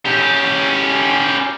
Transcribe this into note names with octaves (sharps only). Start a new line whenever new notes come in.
C#4 G4